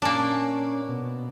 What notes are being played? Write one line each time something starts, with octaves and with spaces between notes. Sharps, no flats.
A#2 A#3 C#4 D4 G#5 A5
B2